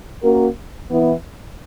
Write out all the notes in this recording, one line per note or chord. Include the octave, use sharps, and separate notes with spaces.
A#3 C#4 F#4 A#4
E3 B3 E4